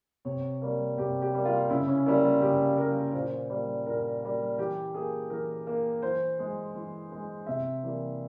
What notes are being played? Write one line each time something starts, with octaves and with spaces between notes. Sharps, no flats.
C3 C#5
G3 A#3
C3 G4
G4
G3 A#3
F4
C#3 E4
C#4
G3 A#3 E4
F4
C#3 G4
G3 A#3 A#4
A#2 C5
G3 A#3
A#2 A#4
G3 A#3
E3 G4
A#3 G#4
E3 A#4
A#3
E3 C5
G#3
E3
G#3
C3 E5
E3 G3 A#3